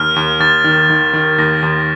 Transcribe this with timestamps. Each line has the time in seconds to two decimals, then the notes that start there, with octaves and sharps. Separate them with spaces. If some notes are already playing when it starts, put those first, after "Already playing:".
Already playing: D#2 F6
0.16 D#2
0.40 D#2 A6
0.64 D#3
0.90 D#3
1.13 D#3
1.38 D#2 A#6
1.63 D#2